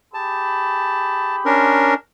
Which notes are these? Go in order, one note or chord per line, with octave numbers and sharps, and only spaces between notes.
G4 G#4 A5 B5
C#4 D4 A#4